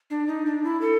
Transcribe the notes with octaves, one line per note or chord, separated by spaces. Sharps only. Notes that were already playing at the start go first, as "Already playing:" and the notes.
D4
D#4
D4
E4
A4